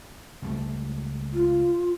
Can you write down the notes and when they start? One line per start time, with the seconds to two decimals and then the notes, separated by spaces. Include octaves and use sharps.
0.42 C#2 G3 A3
1.33 F4